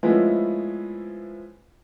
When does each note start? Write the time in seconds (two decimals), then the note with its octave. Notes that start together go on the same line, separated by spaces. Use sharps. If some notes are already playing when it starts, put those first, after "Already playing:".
0.03 F3 G#3 A3 B3 C#4 E4